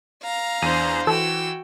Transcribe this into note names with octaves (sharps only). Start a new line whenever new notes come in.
F5 A#5
E2 D4 C5 D#7
E3 F#4 A4 G5 E6